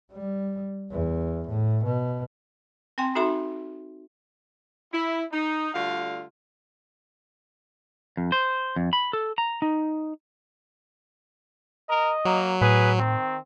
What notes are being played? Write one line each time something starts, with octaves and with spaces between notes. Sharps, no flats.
G3
E2
A2
B2
C4 G5 G#5 C6
D#4 F#4 A4 E5 B5 C6
E4
D#4
D3 G3 A3 F4 F#4 F5
F2
C5
F2
B5
A4
A#5
D#4
A#4 D#5
F#3 A#3
A2 G#4 B4
D#3 C4